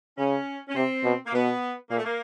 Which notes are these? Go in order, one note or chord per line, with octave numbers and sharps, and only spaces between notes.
C#3 C#4
C#4
C3 C4
B2
A#3
B2 B3
A#2 A#3
A3
A#3